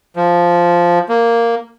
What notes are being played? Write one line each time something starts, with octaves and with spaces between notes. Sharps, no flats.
F3
A#3